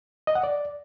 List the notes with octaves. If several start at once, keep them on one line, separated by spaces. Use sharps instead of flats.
D#5
F#5
D5